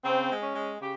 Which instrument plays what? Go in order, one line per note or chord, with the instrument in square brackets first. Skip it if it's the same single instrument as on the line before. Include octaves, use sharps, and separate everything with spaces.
[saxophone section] C#3 C4
G#3
C#4
G#3
C#3 G4